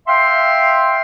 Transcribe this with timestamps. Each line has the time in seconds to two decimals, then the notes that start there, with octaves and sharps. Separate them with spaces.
0.07 E5 F5 G5 C6